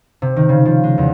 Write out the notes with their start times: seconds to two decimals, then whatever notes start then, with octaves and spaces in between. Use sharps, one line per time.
0.22 C3
0.36 D#3
0.49 C#3
0.65 F3
0.83 G#3
0.98 E2